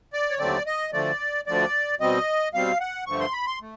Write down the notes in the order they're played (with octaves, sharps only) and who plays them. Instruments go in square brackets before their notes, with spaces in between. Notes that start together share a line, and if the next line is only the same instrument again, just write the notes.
[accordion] D5
C#5
D#2 D3 F#3 A3 C4 D5
D#5
D2 D3 F3 A3 D5
D2 D3 F3 A3 D5
B2 G3 C4 D#5
B2 G3 C4 F5
F#5
G2 D3 F3 A3 C#6
C6
B5
C6
A3